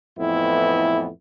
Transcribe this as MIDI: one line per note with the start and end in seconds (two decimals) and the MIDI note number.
0.18 1.08 41
0.18 1.08 45
0.18 1.08 52
0.18 1.08 59
0.18 1.08 64